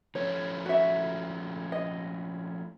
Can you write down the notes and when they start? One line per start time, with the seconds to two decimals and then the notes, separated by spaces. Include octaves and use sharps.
0.15 F3 A3 C#4 C#5
0.66 F#4 E5
1.72 D#5